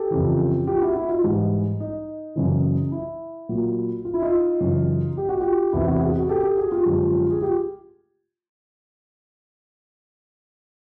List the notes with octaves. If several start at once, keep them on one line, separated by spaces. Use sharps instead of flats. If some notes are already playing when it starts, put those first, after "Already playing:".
Already playing: G4 A4
F2 C#3 E3
F4 G4
E4 F#4
E4 F#4
D#4 F4
G#2 E3 G3
D#4
D#4
F#2 C#3 E3
E4
A#2 F#3
F4
E4
D#4 F4
F#2 C#3 E3
G4
F#4
F4 G4
E2 C3 E3 E4 F#4
E4 F#4
F#4 G#4
F#4 G#4
G4 A4
G4 A4
F#4 G#4
F4 G4
F#2 D3 F3 G#3
G#4
F4 G4